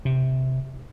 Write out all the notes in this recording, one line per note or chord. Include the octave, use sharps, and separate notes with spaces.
C3